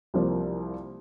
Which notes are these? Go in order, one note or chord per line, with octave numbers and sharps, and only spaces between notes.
C2 C3 F3 A#3 F4